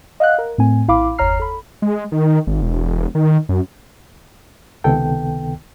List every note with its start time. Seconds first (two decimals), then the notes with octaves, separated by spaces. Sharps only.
0.20 D#5 F5 F#5 F#6
0.38 A#4
0.58 A2 A3 C4 G#5
0.88 A#1 E4 F5 B5 D6
1.18 G1 E2 C#5 A#5 F6 C7
1.40 A4 B5
1.82 G#3
2.12 D#3
2.47 G#1
2.62 E1
3.15 D#3
3.49 F#2
4.84 C#2 C3 D#3 B3 A4 G5